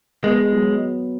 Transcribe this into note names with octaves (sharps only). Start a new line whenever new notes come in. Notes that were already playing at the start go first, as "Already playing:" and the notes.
G#3 B3
F#3